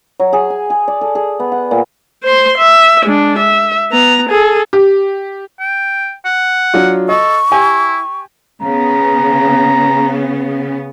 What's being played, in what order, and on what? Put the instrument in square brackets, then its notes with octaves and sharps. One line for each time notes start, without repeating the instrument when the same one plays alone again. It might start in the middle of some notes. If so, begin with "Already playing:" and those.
[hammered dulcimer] F#3
G#4
G#5
G#4
D5
A4
G#4
B3
F#5
A#2
[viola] C5 C6
E5
G#3 D4
E5
B3 A#5
G#4 A4
[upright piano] G4
[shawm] G5
F#5
[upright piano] F#3 D4 F4
[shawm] A4 [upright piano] D#5 [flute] C#6
[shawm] E4 [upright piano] G4 G5 G#5
[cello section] C#3 B3 [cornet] A#5